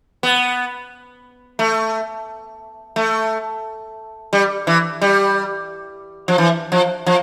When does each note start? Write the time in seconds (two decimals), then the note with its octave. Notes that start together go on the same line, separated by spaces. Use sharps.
0.23 B3
1.59 A3
2.96 A3
4.33 G3
4.67 E3
5.02 G3
6.28 F3
6.38 E3
6.72 F3
7.06 F3